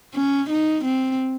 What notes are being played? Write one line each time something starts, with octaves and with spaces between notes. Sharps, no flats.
C#4
D#4
C4